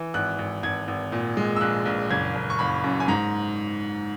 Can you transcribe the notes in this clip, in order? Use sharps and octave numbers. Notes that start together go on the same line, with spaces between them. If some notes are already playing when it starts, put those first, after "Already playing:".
Already playing: E3
G#1 F#6
G#1
G#1 G#6
G#1
A#2
G#3
E6
A#1 F#6
A#1
F#1 G#6
F#1
C#6
F#1 B5
F#2
G#5
G#2 A#5